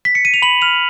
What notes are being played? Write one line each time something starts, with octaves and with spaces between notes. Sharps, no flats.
B6
C#7
D#7
F7
B5 F#7
F6 F7